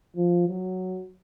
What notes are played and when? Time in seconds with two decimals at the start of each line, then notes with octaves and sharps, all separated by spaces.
0.16 F3
0.48 F#3